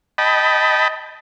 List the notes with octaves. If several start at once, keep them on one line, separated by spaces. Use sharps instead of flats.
D#5 G5 A5 B5